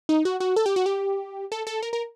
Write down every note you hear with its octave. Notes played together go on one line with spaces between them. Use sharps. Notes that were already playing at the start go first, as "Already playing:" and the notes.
D#4
F#4
F#4
A4
G4
F#4
G4
A4
A4
A#4
A#4